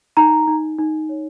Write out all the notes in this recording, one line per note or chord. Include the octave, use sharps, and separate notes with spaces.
D#4 A#5
D#4
D#4
C#5